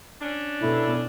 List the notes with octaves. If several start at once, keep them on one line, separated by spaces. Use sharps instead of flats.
C#4 D4
B2 E4 A4